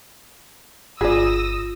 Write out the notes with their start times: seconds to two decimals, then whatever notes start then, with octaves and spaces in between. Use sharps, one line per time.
1.01 G1 F4 G#4 D5 D#6 E6 A#6